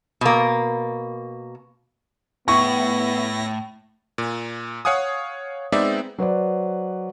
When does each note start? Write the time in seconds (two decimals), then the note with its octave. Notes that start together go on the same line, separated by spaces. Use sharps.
0.21 B2 A#3
2.48 A2 B3 E4 C#6 A#6
4.18 A#2
4.85 C#5 F5 F#5 G#5 D#6
5.72 G#3 B3 C4 D#4 D5 E5
6.18 F#3 B4 C5 D5